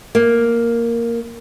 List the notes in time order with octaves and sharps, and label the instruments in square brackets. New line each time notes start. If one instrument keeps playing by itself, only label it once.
[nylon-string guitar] A#3